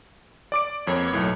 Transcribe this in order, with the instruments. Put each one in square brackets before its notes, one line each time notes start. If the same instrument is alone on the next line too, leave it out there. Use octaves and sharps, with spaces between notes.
[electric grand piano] D5 D6 D7
[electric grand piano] F2 [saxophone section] A#3 B3 C#5
[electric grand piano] B1 A2